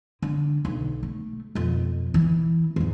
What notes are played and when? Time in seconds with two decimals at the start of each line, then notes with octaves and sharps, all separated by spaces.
0.22 D3
0.65 B1
1.03 A3
1.55 F2 B2
2.14 E3
2.76 E2 G#2